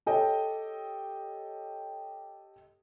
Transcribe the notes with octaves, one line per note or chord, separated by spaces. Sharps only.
G4 A4 C#5 D#5 G5